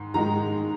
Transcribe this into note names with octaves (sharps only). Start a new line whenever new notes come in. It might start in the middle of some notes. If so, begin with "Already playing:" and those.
Already playing: G#2 D#3
G#2 D#3 G#3 A#5